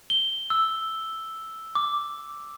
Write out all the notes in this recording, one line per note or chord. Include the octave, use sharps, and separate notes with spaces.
G7
E6
D6